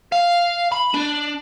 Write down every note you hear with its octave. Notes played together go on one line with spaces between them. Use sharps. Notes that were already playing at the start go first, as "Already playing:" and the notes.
F5
B5
D4